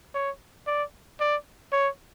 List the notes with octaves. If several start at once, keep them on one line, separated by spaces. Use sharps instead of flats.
C#5
D5
D5
C#5